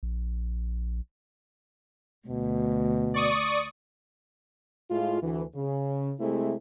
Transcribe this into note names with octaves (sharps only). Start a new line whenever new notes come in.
A#1
D2 B2
D5 C#6 D#6
A2 G#3 F4
D2 E3
C#3
C3 G#3 A3 C4 E4